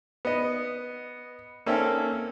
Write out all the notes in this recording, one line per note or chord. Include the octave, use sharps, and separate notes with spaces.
B3 D#5
A#3 C4 C#4 A4 E5 G5